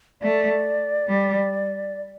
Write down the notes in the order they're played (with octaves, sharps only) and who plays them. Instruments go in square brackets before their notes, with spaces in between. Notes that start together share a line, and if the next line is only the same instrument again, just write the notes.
[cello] A3 [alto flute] D5
[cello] G3